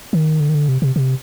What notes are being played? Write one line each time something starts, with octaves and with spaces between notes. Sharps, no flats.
D#3
D3
D#3
D3
C3
C3
C3